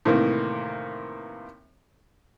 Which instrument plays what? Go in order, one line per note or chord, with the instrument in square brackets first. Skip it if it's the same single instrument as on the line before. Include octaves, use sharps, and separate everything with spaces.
[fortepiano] A2 C3 D#3 E3 A#3